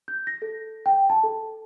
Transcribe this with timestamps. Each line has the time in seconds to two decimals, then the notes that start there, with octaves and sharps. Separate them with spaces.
0.08 G6
0.27 A#6
0.42 A4
0.86 G5
1.10 A5
1.23 A4